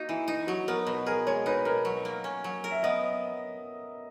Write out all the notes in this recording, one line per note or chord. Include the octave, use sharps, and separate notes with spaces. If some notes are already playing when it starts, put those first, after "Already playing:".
Already playing: A#3 D#4 F#4
E3 E4
D#4
F#3 F#4
B3 A#4
B2 B4
G#4 A#4
G#3 C#5
D#4 B4
B2 A#4
F#3
A#3
C#4
F#3
A#4
E5
B3 D#5